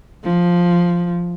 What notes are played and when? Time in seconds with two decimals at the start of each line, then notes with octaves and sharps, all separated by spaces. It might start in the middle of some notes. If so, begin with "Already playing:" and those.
0.24 F3